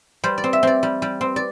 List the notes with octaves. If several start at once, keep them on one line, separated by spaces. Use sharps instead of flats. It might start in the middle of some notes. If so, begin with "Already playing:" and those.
G3 C5
D5
C4
E5
C4 D5
G3
G3
C4
D5